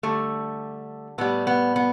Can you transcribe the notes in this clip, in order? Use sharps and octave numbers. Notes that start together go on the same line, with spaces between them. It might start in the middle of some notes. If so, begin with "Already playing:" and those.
D3 G3 A3
A2 G3 B3
B3
B3